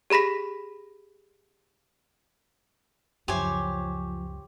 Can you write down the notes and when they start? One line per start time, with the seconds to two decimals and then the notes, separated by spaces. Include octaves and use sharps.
0.10 G4 G#4 B5 A#6 B6
3.28 C#2 F#2 F3 G4 C5 C#5 G#5